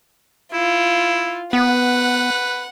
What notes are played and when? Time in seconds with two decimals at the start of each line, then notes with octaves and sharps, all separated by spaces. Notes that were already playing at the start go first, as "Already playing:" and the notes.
0.53 E4 F4
1.53 B3 B4 F#5